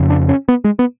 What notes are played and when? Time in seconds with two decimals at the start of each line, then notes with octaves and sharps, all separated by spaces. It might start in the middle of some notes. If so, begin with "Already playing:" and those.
Already playing: F2 C#3
0.10 D4
0.29 C#4
0.48 B3
0.64 G#3
0.79 B3